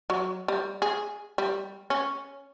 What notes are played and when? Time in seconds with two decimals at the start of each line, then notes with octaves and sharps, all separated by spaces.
0.10 F#3
0.48 G3
0.82 G#4
1.38 G3
1.90 C#4